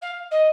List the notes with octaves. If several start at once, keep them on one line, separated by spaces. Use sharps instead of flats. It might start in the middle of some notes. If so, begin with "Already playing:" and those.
F5
D#5